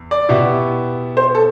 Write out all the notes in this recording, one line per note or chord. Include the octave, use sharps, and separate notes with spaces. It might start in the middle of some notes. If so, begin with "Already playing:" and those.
Already playing: E2
D5
B2 B3 E4 G4
C5
A4